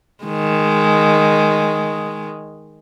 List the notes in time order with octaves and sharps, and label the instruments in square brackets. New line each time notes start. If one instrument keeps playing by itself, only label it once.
[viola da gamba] D#3 G#3